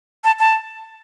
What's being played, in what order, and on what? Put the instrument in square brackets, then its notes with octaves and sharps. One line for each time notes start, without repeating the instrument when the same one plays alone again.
[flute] A5
A5